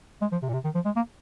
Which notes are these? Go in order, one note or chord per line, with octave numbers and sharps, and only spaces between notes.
G#3
F3
C3
A#2
C3
D#3
F3
G#3
A#3